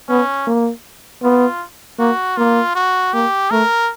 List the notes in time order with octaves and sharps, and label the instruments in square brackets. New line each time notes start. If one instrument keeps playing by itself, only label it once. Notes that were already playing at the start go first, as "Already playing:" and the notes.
[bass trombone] B3 [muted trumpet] C#4
[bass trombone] A#3
[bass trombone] B3 [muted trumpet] F4
[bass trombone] A#3 [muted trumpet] F#4
[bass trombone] A#3 [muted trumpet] F4
[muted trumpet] F#4
[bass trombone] A#3 [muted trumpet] G4
[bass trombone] A3 [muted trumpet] A#4